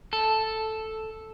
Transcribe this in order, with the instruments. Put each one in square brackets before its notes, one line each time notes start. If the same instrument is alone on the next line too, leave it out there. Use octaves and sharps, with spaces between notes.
[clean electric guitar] A4